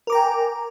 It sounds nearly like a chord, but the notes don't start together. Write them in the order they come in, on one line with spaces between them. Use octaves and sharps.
A#4 D6 A#5 G5 G#5